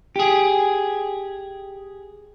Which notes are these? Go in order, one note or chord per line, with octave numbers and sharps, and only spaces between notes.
G4 G#4